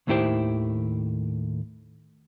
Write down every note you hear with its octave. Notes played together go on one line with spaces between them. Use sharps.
D#2 A2 D#3 E4 G4 C5